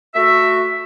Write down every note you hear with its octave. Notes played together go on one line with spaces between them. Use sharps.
A3 F#4 E5